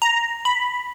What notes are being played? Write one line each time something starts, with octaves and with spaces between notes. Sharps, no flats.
A#5
B5